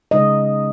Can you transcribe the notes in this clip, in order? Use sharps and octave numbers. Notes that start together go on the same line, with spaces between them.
C#3 G#3 D#4 D#5